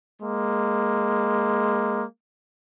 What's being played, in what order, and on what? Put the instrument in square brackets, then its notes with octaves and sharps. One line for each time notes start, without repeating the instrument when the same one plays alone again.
[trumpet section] G#3 A#3